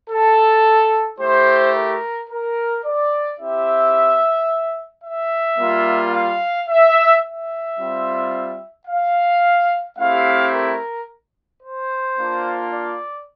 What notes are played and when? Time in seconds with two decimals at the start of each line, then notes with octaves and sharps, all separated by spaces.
0.10 A4
1.19 A3 E4 G4 C5
1.74 A#4
2.30 A#4
2.85 D5
3.39 C4 E4 G4 E5
5.04 E5
5.58 G3 A#3 F4
6.14 F5
6.69 E5
7.23 E5
7.78 G3 C4 F4
8.88 F5
9.98 A3 C4 E4 G4 F5
10.54 A#4
11.63 C5
12.18 A#3 D4 F4
12.72 D5